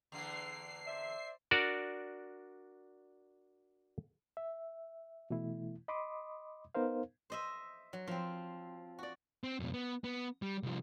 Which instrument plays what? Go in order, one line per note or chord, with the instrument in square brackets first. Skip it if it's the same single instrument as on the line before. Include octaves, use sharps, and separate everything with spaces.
[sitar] E2 D3 A#3 [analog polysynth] C7
[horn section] C5 D5 E5
[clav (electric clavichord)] D4 F#4 A#4 D5
[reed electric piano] E5
B2 E3 A3 E4
D#5 B5 C6 D6 D#6
B3 D#4 A#4 C5 F5
[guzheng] C5 D#5 E5
F#3
F3 C4
F#4 D5
[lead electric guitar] C4
F2 B2
B3
B3
G3
C2 F3